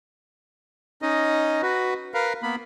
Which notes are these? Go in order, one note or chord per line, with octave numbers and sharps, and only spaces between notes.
C#4 D#4 D#5
F#4 B4
A#4 B4 F5
A#3 B3 B5